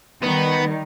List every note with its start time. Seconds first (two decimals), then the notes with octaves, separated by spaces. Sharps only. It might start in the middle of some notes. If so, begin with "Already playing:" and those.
0.23 D#3 G3 B3